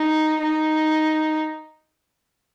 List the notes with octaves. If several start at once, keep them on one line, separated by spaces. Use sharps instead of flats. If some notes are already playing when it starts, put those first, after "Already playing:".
Already playing: D#4
D#4